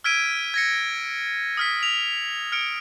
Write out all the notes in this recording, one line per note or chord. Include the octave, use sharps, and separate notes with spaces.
E6 F6 G#6 B6 D7 D#7
G#6 A#6 C#7
D#6 F6 B6
F7
F6 C#7 D7